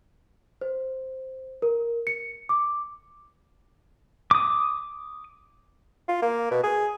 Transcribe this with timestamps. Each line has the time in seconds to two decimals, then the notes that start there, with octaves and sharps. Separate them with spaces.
0.61 C5
1.62 A#4
2.07 C#7
2.49 D6
4.31 D6 D#6
6.08 F4
6.22 A#3
6.51 B2
6.63 G#4